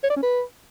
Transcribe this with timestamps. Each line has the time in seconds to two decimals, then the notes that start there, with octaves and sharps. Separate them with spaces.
0.03 C#5
0.10 D5
0.16 C#4
0.23 B4